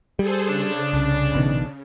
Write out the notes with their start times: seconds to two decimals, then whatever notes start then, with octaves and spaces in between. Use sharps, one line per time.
0.19 G3 G#4 A4 C5
0.49 C#3 D4
0.93 C2
1.34 A#1 B2 D#3